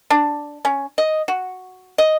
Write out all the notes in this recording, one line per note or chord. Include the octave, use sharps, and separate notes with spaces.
D4
C#4
D#5
F#4
D#5